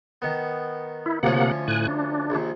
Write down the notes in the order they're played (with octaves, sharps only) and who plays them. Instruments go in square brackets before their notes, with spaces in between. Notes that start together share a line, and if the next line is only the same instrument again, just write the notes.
[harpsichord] D#3 B3
[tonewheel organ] E4
[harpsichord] D2 F3 C#4 [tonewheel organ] C3 A#3 F#5
[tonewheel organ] A2 G#5 F#6
D4
[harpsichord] A#1 D#2